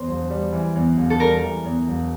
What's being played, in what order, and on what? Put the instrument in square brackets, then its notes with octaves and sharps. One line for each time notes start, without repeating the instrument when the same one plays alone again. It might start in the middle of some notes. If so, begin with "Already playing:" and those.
Already playing: [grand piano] E2 [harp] C5
[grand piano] E1
G3
E3
E2
E1
[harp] A4
[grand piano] G3 [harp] A#4
[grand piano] E3
E2
E1